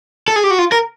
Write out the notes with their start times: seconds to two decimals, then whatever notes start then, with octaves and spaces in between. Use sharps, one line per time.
0.28 A4
0.36 G#4
0.44 G4
0.51 F#4
0.59 F4
0.72 A#4